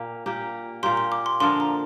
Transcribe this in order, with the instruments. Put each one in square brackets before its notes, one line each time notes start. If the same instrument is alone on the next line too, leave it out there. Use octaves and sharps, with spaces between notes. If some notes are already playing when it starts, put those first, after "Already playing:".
Already playing: [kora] A#2 A#3 G4
A#2 A#3 G4
[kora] A#2 A#3 G4 [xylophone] C6
[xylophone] C6
D6
C6
[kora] D3 F3 D4 A#4 [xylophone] C6
[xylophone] A#5